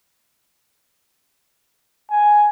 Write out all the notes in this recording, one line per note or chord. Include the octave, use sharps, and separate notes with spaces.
G#5